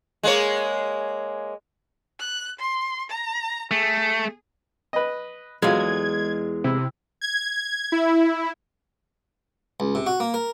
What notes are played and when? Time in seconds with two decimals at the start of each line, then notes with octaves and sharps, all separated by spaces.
0.23 G#3 A#3 C#5
2.19 F#6
2.59 C6
3.10 A#5
3.71 A3 G#4
4.93 B4 D#5
5.62 E2 F#3 G#3 F4 G#6
6.64 C3 E4
7.21 G#6
7.53 G#6
7.92 E4
9.80 C#2
9.95 C3
10.06 F#4
10.20 A#3
10.34 A#4